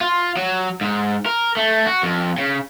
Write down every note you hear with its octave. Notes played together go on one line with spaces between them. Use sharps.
F4
F#3
G#2
A#4
A3
F#4
F2
C#3